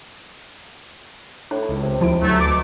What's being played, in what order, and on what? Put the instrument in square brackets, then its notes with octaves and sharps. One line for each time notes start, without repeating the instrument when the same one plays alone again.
[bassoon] A2 [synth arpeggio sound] D4
[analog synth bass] C#2
[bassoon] C3
[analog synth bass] D#2 [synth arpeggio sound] F3 E4 D7
[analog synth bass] D2 [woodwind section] F#3 A3
[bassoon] B2 [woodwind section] D6